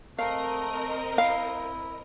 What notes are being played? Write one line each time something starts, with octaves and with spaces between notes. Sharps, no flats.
A3 C4 A#4 D#5 F5
E4 F5